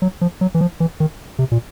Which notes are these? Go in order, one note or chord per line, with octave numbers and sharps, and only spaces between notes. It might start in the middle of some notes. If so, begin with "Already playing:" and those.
F#3
F3
F#3
E3
F3
E3
D#3
C3
A#2